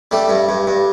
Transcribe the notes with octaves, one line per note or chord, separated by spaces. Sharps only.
G3 A3
G2
G2
G2